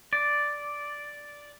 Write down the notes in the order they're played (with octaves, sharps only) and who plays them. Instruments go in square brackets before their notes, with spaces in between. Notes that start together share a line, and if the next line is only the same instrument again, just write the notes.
[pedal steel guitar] D5